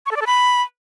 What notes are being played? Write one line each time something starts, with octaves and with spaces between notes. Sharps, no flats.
C#6
A4
D5
A4
B5